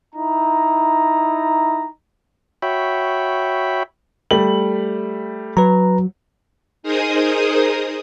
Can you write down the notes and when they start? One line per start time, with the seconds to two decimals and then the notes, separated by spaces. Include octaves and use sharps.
0.14 D#4 E4 A#5
2.62 F#4 C#5 E5 G5 B5
4.31 G3 A3 F#7
5.57 F#3 B4 A#5
6.83 D#4 G#4 A#4 C5 D#6